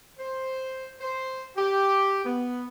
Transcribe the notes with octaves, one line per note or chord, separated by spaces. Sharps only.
C5
C5
G4
B3